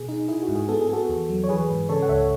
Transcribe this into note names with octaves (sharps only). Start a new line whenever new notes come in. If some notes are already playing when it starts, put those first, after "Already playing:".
Already playing: B2 G#4
D#4
E4 G#4
F#4
G#2
G#4
B3 A4
G#4
B3 F#4 A4
E2
F#3
C#5
E3 G#4 B4
G#2
C#3 A4 C#5
F#5
C#2 C#5 E5